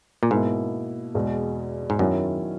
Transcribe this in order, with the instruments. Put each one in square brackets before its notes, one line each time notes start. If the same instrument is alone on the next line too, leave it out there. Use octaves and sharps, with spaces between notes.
[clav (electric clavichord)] A#2
[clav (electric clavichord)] G#2 [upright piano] B2 A#3 E4
[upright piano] E2 B2 G#3
[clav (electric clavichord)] G#2
[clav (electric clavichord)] F#2 [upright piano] D#3 F#3 C#4 E4